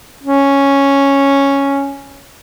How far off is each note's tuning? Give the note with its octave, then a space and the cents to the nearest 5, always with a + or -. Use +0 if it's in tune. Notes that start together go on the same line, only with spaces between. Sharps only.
C#4 +0